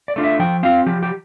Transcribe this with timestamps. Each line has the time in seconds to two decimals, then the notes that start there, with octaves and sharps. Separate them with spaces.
0.08 D5
0.16 A3 D4 F4
0.24 E5
0.39 F3 G5
0.63 C4 F4 F5
0.86 F3 G4
1.03 G4